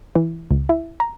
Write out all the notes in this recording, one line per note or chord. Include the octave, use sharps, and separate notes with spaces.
E3
C#2
E4
A#5